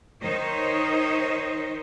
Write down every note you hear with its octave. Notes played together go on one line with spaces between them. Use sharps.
D#3 D#4 C5 C#5 D#5